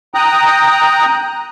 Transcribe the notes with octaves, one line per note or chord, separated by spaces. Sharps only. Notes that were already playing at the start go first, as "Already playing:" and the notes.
G5 A#5 D#6 F#6